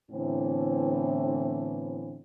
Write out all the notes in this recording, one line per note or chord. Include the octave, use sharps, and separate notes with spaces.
A2 D3 E3 B3 C4